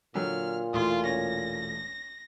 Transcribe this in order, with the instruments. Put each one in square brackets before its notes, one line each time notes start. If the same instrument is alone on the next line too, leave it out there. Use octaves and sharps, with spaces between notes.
[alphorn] A#2 [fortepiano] D3 F#3 [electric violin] F6
[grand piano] E1 A3 E4 [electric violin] F4 [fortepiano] C6 D#6
[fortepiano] C#4 [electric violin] A#6